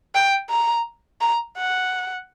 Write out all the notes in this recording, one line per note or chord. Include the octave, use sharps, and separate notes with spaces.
G5
A#5
A#5
F#5